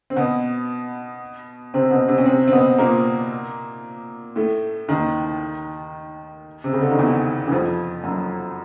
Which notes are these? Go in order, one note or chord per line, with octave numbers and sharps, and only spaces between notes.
C4
B2 B3
C3 C4
B2 B3
C3 C4
C#4
C3 C4
C4
B2 B3
A#2 A#3
A2 A3
D#2 D#3
C3
C#3
D3
D#3
E2 E3
E3
F2 F3
F#2 F#3